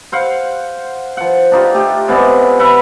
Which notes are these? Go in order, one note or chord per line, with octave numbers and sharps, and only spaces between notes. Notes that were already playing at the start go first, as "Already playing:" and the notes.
C5 F5 F#5
F3 F#5
D4 D#4 F4 G4
A3 G4
C3 G#3 B3 D5
B4 E5 F#5 B5